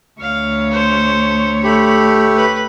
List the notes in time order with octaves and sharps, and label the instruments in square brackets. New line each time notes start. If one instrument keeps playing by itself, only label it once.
[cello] D2 C#5 [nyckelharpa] F5
[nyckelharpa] C5
[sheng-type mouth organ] A3 G4 [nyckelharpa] B5
[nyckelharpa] B4 B5